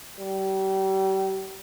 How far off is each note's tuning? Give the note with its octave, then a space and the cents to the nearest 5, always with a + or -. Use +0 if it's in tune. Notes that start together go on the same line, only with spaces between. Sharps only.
G3 -35